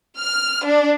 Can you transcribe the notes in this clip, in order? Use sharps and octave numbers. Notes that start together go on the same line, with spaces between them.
F6
D4